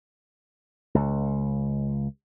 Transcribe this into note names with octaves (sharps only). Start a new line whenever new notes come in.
C#2